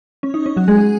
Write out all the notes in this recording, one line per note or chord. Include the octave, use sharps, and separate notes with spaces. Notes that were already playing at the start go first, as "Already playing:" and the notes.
C#4
D#4
C#4
F#3 F#4
G#3 G#4